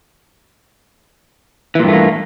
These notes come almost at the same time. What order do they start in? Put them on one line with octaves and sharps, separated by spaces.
E3 A#2 G2 A3 A#3